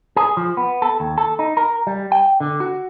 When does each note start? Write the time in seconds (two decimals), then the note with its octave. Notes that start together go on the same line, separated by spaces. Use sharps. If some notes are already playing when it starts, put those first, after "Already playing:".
0.16 G#4
0.37 F3
0.57 B3
0.82 A4
1.00 D#2
1.18 A4
1.39 D#4
1.57 A#4
1.87 G3
2.12 G5
2.40 D3
2.60 F#4